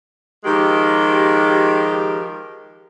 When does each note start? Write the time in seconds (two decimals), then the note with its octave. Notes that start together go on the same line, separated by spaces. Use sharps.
0.44 D#3 F3 G#3 G4